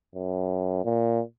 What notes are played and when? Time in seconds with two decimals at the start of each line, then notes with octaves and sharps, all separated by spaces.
0.15 F#2
0.84 A#2